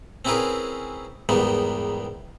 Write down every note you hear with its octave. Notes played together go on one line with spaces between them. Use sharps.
C4 C#4 E4 G#4 A#4 B4
E2 G#2 D#3 G3 B3